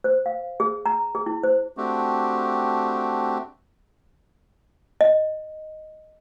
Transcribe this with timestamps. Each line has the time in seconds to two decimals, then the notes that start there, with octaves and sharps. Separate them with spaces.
0.04 C5
0.26 F5
0.60 G#4
0.86 A#5
1.15 G#4
1.26 E4
1.43 C5
1.77 A3 C4 D4 F#4 G4
5.01 D#5